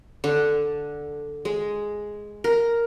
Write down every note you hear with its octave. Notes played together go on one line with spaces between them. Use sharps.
D3
G#3
A#4